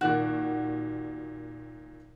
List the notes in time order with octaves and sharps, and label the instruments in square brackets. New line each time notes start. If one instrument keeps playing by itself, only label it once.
[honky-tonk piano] A#2 D#3 [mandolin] F#4 D5 F#6